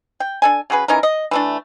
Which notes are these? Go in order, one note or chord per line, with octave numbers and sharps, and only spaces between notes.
G5
D4 A4 G#5
C#3 F#4 G#4 B4
E3 C#4 D#4 A#4
D#5
E3 A3 D4